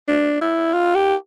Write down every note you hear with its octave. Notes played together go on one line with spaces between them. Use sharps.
D4
E4
F4
G4